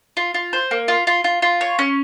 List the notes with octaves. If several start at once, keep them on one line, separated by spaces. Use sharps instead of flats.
F4
F4
C5
A#3
F4
F4
F4
F4
C#5
C#4